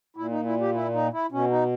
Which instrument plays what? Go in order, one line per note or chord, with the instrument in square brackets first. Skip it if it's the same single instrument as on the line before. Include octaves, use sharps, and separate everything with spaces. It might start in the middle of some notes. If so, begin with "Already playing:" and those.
[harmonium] A#2 E4
D#4
E4
G4
E4
D#4
E4
B2 C#4
D#4